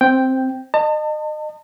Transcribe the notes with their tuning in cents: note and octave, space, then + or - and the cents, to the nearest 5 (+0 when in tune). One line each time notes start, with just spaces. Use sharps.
C4 +5 G5 +0
D#5 -30 A5 +35